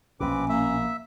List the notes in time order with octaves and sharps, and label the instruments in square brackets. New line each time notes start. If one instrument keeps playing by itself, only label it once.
[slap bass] A#1 B2 [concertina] C4 B4 D6 [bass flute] C#4
[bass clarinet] A#3 [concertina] E5